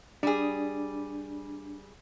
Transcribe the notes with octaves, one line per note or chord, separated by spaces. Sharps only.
G3 D4 G#4